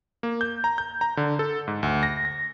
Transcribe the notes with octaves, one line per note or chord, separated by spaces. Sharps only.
A#3
G6
A#5
G6
A#5
D3
A4
G#2
D2
A#6
A#6